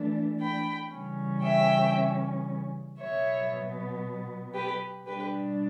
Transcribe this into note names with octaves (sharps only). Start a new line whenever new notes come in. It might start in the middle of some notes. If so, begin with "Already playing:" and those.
Already playing: E3 A3 D4
G5 B5
C#3 E3 G3 C#4
E5 G5
B2 F#3 B3 C#5 E5
G4 B4
B2 G3 D4 G4 B4